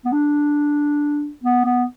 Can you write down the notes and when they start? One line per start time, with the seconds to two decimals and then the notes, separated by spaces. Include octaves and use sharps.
0.05 B3
0.12 D4
1.43 B3
1.65 B3